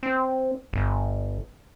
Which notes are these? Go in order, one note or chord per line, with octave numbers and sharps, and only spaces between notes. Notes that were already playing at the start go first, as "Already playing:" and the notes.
C4
G1